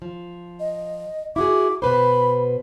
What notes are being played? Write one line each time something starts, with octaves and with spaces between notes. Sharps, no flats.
F3
D#5
E4 F#4 G#4 D6
B2 B4 C5 B5